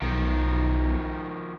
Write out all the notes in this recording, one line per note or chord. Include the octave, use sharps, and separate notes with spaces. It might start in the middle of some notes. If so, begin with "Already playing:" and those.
B1 D#3 F3